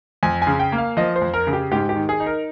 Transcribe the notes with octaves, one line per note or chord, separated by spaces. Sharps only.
F2 G#5
G#5
C#3
G5
A#3
F5
F3 D#5
C5
F2
A#4
C#3
G4
G#2 G4
G4
D#3
G#4
D#4
A#4